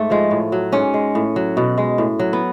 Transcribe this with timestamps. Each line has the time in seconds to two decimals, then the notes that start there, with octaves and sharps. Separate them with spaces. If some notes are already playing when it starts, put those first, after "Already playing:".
Already playing: G#2 A3
0.10 F3 G#3
0.31 A2
0.52 F#3
0.72 G#2 C#4
0.94 G#3
1.15 A2
1.36 F#3
1.57 B2
1.78 G#3
1.98 A2
2.19 F#3
2.33 B3